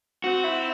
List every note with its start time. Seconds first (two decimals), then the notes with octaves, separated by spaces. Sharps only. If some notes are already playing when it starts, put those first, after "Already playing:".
0.24 C4 F#4
0.44 E4